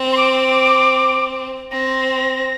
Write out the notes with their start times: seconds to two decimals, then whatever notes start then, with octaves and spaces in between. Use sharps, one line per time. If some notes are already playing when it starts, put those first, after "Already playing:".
Already playing: C4
0.12 C6
0.17 D6
1.71 C4 A#6